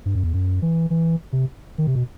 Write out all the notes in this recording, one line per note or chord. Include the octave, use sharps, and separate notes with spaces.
G2
F#2
E2
F#2
E3
E3
C3
D#3
C3
B2